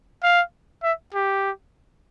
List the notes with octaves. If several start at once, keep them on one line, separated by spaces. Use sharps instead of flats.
F5
E5
G4